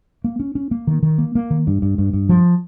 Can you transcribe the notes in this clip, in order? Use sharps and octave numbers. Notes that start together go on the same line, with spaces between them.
A#3
C#4
C#4
A#3
D#3
D#3
A#3
A#3
D#3
G2
G2
G2
G2
F3